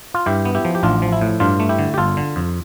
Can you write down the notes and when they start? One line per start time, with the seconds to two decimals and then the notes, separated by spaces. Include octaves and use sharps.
0.14 F4
0.26 G2 E4 G4
0.45 B3
0.55 E4 G4
0.65 F3
0.75 G4
0.83 A1 D4 F4
1.02 F3
1.12 E4
1.21 A2
1.40 G2 D4 F4
1.60 A3
1.69 E4 G4
1.79 D3
1.94 G4
1.98 G1 F4 A4
2.17 D3
2.36 F2